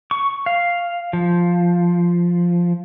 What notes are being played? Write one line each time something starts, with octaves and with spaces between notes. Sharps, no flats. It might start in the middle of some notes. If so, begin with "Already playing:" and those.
C#6
F5
F3